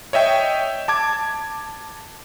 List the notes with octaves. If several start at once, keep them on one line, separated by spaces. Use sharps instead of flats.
C#5 D#5 E5 G5
A5 D6 G#6